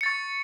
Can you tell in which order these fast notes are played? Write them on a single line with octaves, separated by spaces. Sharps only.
C#7 A6 C#6